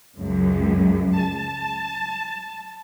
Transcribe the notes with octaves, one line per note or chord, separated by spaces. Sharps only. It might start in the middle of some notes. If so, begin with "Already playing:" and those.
C#2 F#2
A5